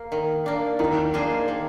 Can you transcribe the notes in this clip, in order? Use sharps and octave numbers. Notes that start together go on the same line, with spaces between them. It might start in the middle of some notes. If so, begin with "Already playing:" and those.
Already playing: A#3
D#3
A#3 D4
D#3 D#4
A#3 D4 G#4 C5
D#3